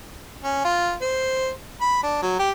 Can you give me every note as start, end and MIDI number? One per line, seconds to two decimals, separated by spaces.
0.44 0.65 61
0.65 0.94 65
1.02 1.50 72
1.81 1.99 83
2.03 2.21 62
2.22 2.39 54
2.39 2.51 67